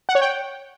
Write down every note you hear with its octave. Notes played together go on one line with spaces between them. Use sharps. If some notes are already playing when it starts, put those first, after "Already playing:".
F#5
C#5
G5